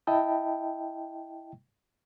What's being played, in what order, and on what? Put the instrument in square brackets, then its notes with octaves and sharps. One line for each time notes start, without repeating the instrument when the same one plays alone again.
[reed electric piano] E4 D#5 E5 G5 A5 B5